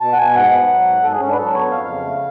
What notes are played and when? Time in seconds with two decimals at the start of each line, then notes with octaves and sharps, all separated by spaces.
0.01 B2 A5
0.13 F#5
0.18 B2 G#5
0.34 G#2 F#5
0.52 B3
0.68 F#3
0.86 G#2
1.03 G#2 A4
1.12 G#4
1.20 G#2 C#4
1.29 D4 B4
1.37 F#3 A4
1.54 B3 C#5
1.71 F2 F5
1.87 C#3
2.05 A3